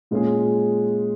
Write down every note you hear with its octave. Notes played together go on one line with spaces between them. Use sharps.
A#2 G#3 C#4 F4 G#4